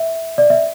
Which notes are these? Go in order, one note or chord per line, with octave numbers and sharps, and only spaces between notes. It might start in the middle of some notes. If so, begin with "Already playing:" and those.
Already playing: E5
D5
E5